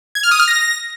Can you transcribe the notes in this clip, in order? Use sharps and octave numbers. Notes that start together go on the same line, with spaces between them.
G#6
F6
D#6
F6
A#6